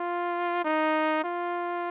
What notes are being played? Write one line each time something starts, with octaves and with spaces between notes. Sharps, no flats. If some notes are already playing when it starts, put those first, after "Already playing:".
Already playing: F4
D#4
F4